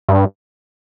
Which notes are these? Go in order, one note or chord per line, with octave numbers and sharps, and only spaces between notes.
G2